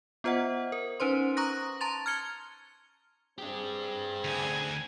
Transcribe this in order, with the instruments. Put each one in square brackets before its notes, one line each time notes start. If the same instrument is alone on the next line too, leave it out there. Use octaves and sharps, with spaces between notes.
[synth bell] B3 F4 C5 D#5 F#5
A#4
C#4 D#4 B4 C5 C6
A#5 C#6 D#6 F#6 A#6
A5 A#5 C6 A6 F7
F6 G#6 C#7 G7
[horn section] C4 G#4 [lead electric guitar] D4 G4
[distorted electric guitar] D2 [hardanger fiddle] G#5